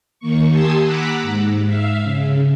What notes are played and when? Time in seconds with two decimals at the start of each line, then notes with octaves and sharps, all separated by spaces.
0.19 D#3 A#3 C#6
0.49 G4 G#5 A5 C6 D#6 E6
0.82 F#5 A#5 B5 D6 E6 F#6
1.23 G#2
1.65 E5 F5
2.03 C#3